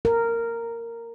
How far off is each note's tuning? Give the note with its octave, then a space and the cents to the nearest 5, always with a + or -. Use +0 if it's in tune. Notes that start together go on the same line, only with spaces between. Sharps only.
A#4 -10